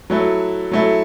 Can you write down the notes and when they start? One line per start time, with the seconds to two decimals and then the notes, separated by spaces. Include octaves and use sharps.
0.10 F#3 A3 E4
0.71 F#3 A3 E4